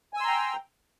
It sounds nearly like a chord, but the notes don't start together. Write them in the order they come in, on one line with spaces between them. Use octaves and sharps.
G#5 E6 C6 A#5 G5